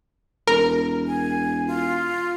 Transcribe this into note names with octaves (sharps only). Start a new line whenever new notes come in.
E1 A#4
G#5
F4